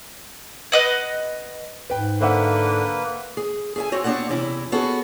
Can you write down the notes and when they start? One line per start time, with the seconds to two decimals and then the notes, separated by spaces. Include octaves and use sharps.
0.72 B4 D#5 F#5
1.90 G#2 B4 G5
2.21 D3 A#3 B4 C5 E5 F#5
3.37 G#4
3.76 G#4 E5 G#5
3.92 C4 F#4 C#5
4.04 B3 C4 D4 C#5 D5 F#5
4.29 E2 C3 C#4 E4
4.72 B3 C#4 F#4 G#4 A4